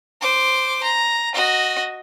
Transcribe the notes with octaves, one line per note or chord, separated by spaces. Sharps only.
C5 D6
A#5
F#4 D#5